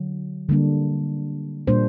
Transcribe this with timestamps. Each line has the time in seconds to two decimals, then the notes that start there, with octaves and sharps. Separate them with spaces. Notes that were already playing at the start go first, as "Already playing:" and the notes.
Already playing: D3 F#3
0.49 D3 G3 A#3 D4
1.67 A#2 G3 A#3 D4 C5